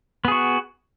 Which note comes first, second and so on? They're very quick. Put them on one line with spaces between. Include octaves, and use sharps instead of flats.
B3 G#4 F#4